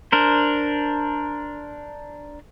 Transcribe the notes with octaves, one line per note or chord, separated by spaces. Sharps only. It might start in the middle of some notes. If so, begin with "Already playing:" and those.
D4 A#4 C5